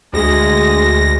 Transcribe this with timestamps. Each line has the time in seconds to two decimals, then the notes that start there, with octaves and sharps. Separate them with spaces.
0.13 D2 G#3 A#6